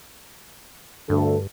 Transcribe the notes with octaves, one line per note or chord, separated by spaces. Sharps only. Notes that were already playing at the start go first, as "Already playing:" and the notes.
D2 G2 D3 A4